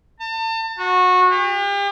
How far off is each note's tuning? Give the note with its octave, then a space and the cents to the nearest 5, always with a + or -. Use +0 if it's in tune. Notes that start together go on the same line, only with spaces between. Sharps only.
A5 +35
F#4 -20
G4 +40